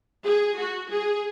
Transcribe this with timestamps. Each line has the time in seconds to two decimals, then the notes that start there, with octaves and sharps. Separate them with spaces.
0.24 G#4
0.58 F#4
0.90 G#4